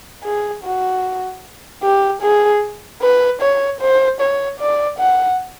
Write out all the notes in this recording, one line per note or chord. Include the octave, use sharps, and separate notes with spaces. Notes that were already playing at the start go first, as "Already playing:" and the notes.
G#4
F#4
G4
G#4
B4
C#5
C5
C#5
D5
F#5